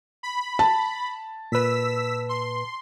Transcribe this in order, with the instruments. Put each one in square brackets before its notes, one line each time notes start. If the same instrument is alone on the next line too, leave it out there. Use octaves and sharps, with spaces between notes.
[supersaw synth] B5
[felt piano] A5
[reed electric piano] A#2 B4 [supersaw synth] E6 B6
[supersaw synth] C6